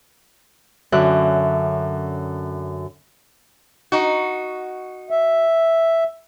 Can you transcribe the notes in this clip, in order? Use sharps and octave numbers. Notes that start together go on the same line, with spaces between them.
F#2 D3 C#4 E5 F#6
D#4 F#4
E5